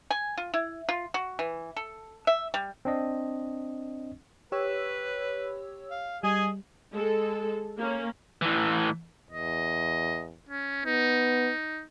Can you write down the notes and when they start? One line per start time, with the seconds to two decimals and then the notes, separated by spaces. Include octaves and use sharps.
0.11 G#5
0.37 F4
0.54 E4
0.89 F4
1.14 F#4
1.39 E3
1.76 A4
2.27 E5
2.54 G3
2.85 C4 D4 D#5
4.52 G4 B4 C#5 E6
5.91 F5
6.23 G3 G#4 D#5 G#5
6.94 G#3 A4
7.79 A#3 C#4
8.42 A2 E3
9.31 E2 D#5
10.49 C#4
10.86 B3 D#4